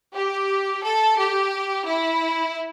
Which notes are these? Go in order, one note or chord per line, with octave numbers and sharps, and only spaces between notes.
G4
A4
G4
E4